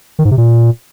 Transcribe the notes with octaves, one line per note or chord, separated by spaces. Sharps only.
D#3
G#2
C3
A#2